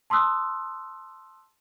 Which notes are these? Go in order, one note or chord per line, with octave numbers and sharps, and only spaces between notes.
A5 C6 D#6 E6 F#6